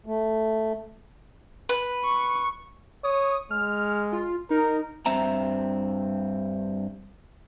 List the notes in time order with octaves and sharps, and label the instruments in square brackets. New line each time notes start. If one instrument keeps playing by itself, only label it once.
[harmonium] A3
[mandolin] B4
[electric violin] C#6
[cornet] C#5 [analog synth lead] D#6
[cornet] G#3 [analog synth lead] F6
[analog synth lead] F4
[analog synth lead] D#4 [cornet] A#4
[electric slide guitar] G2 C4 E5 A#5